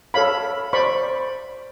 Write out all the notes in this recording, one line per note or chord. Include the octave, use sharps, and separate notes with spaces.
A4 C#5 F5 B5
C5 D5 B5 C#6